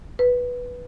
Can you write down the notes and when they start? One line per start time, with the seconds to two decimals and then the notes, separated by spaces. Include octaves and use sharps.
0.19 B4